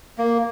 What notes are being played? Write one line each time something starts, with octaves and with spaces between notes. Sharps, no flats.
A#3